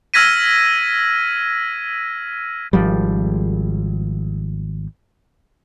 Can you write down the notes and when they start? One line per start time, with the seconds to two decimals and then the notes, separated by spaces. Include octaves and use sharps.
0.14 E6 F6 G#6 A#6 B6 D#7
2.73 G#1 F3 G3